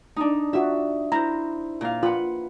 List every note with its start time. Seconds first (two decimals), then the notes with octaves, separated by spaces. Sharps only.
0.16 D4 D#4
0.53 F4 F#4 D5 E5
1.12 E4 C5 A#5
1.81 A#2 F5
2.03 F4 B4 F#5